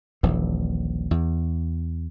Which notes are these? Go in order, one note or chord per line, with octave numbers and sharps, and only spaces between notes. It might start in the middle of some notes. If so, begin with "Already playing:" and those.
D#1 A#1 E3
E2